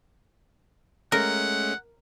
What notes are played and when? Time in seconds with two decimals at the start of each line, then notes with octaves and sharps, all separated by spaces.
1.12 G#3 A3 C#4 A#4 F#5